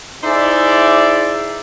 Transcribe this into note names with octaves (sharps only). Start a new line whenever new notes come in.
D#4 E4 G#4 C5 D5 E5